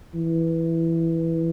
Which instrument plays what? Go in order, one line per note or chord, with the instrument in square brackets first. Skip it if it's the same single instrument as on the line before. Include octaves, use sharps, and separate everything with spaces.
[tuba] E3